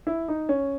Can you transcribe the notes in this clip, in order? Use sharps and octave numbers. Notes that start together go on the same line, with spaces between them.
E4
D#4
C#4